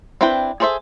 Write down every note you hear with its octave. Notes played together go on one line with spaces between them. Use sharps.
C4 D4 E4 B4 G5
G#4 A4 C5 C#5 E5